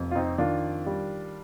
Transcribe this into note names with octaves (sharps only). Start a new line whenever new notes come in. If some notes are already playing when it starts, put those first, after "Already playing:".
Already playing: F1 F2
F4
C4 D#4
D#3 D4 F4
G3